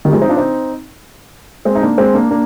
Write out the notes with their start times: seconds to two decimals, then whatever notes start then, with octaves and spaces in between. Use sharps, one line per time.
0.05 D#3 G3
0.12 F3 G#3
0.22 C4 D#4
0.29 D4 F4
0.37 C4 D#4
1.65 G#3 C4
1.75 D#4
1.82 A#3 D4
1.98 G#3 C4
2.14 A#3 D4
2.30 A#3 D4